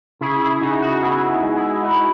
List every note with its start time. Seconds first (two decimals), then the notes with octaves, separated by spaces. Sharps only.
0.21 C#3 E4 G#4
0.41 E4 G#4
0.61 C#3 D#4 F#4
0.82 D#4 F#4
1.02 B3 E4 G#4
1.43 G#3
1.56 E4 G#4
1.83 D#4 E4 F#4